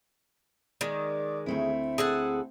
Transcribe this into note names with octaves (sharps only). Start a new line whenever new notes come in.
D#3 G#3 D5
D2 A3 C4 E4
G#4 A4 F#5